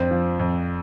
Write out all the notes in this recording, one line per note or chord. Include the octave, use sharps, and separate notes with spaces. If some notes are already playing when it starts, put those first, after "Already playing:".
Already playing: F2 C4 D4
F3
F2